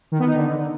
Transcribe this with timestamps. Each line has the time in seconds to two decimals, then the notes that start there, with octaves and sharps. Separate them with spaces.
0.12 D#3
0.19 B3
0.27 D#4
0.35 D3